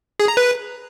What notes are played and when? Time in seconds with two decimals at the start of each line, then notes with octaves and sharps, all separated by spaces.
0.20 G#4
0.28 A#5
0.37 B4